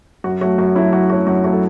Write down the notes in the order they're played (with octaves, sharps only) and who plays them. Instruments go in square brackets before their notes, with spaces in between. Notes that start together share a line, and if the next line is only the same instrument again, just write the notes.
[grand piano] F#2 F#4
F#3 A3 F#4
F#2 F#4
F#3 E4
A3
F#2 F#4
A3 F#4
F#3
F#2 F#4
F#3 A3 F#4
A4